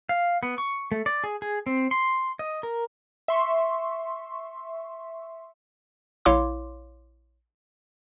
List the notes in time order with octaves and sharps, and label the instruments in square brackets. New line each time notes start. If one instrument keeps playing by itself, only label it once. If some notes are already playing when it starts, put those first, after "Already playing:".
[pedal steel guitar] F5
B3
C#6
A3
D5
G#4
G#4
C4
C6
D#5
A#4
[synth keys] E5 C6 C#6
[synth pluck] A#1 E4 C#5 F5 C6 D6